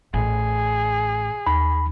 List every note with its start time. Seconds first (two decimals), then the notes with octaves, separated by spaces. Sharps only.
0.14 A1 G#4
1.47 D#2 B5